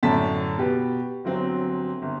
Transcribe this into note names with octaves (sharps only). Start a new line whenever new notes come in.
F#2 A2 D3 D4 A5 B6
B2 G4 B4
G1 F#3 C4
G1